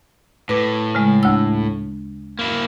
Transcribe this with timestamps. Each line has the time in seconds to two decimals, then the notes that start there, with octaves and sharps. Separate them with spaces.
0.49 A2 B4 D6
0.95 C#3 G#3
1.23 D2 E6
2.39 A#3 E4